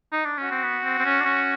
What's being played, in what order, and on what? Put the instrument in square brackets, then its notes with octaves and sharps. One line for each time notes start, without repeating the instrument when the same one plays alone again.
[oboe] D#4
D4
[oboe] C#4 [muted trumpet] F#4
[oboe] C4
B3
C4
C4
C#4
D4
C#4